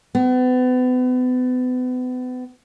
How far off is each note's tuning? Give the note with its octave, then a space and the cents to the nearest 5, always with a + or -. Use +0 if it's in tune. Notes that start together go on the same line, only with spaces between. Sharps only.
B3 +35